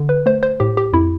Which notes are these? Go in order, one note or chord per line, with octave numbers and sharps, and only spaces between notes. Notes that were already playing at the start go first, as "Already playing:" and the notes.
Already playing: D3
B4
A3 C5
C5
A2 G4
G4
F2 E4